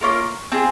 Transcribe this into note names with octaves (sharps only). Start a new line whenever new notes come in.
A#3 C#4 F4 A#4
C4 F4 G#4